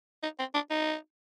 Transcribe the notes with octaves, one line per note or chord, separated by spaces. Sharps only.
D#4
C4
D4
D#4